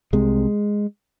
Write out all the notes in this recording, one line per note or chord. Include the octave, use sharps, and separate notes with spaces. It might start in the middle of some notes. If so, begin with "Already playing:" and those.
C2 C3 G#3